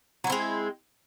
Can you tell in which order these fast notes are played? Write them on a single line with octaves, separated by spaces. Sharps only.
F#3 E4 C4 G#3